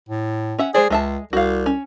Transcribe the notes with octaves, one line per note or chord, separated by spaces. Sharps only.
A2
C#4 E5 F#5
G#3 G#4 C5 D5
C#2 G#3 E5 A5
C2 F#4 F5
C#4